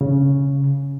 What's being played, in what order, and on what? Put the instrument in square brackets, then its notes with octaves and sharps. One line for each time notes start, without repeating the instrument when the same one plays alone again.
[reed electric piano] C#3